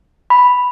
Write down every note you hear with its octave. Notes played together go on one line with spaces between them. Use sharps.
B5